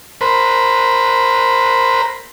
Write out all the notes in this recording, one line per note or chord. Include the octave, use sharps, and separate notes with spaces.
A#4 C5 B5